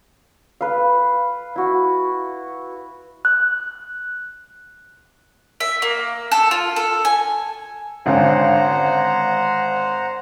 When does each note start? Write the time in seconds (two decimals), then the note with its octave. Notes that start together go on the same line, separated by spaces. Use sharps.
0.61 B4 F5
1.56 E4 F#4
3.25 F#6
5.60 E5
5.82 A#3
6.31 A4
6.51 F4
6.76 A4
7.05 G#5
8.06 G#1 D3 C#4 C5 F#5 A#5